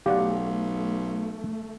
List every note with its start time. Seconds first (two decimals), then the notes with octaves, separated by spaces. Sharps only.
0.06 B1 A3 G4 D5 F5 F#5